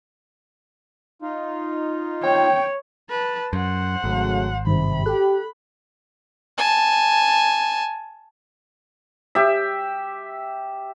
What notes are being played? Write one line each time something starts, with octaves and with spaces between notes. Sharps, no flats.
D#4 F4
C#5 G5
B4 A5
F#2 C5 F#5
G#1 C#3 F#3 A3
G2 C3 D#3 B5
G4 A4 F#6
G#5 A5
G4 E5